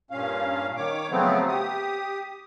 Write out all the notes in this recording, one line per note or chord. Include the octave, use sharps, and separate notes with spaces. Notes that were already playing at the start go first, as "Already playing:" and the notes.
G2 A#2 C#4 F5
D#3 C#5 D6
C#3 F3 F#3 A3 B3 C4
G4 D#6